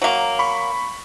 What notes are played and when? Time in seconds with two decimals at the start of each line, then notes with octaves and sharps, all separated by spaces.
0.02 F#3 A#3
0.39 B5 C#6